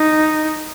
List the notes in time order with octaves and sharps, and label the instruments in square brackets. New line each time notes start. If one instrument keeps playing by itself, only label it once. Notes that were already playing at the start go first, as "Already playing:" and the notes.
Already playing: [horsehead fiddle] D#4